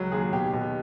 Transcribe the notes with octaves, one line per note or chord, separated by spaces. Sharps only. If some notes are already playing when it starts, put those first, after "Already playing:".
Already playing: C#2 F#3
D#2 G#4
B2 G4
B2